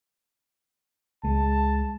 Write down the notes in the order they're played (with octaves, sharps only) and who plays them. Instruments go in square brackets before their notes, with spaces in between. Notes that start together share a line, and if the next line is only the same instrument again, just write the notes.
[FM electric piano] C#2 G#3 [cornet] A5